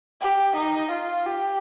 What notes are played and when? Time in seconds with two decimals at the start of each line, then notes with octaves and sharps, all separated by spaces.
0.22 G4
0.56 D#4
0.92 F4
1.26 G4